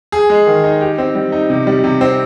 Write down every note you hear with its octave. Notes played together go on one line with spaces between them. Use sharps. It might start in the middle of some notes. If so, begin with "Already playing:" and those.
G#4
G#3
D#3
D#4
G4
C4
G3
D#4
C3
G3
C3
C4